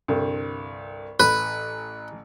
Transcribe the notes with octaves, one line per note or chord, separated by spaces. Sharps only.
C2 G2 D3
A1 B4